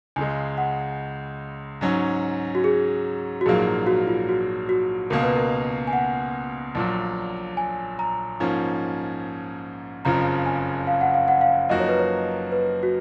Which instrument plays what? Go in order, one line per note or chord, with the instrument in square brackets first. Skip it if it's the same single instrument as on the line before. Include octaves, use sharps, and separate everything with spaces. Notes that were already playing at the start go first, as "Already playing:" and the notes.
[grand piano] C#2 C#3 G#3 [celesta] G#5
[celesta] F#5
[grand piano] G#2 F#3 C#4
[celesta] F#4
G#4
F#4
[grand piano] A#1 G#2 F#3 A#3 F4 [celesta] G#4
[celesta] F#4
F4
F#4
F#4
[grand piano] C#2 B2 A#3 [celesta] A#4
[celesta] B4
A#4
G#5
F#5
[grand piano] A#1 A#2 F#3
[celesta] G#5
A#5
[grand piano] G#2 F3 A#3 C#4
[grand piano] F#1 F2 C#3 F3 [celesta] A#5
[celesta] G#5
F5
F#5
F5
F#5
F5
[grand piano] F#2 F3 A#3 D#4 F#4 [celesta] D#5
[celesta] C#5
B4
C#5
B4
F#4